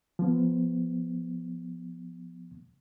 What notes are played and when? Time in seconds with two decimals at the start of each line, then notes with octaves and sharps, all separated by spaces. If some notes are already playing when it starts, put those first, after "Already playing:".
0.19 F3 B3